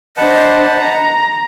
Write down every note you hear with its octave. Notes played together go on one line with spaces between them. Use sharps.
D4 B4 C5 D#5 F#5 A5
A#5